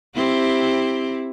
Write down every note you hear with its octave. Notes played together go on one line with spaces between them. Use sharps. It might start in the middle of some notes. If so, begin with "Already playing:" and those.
C4 E4 G4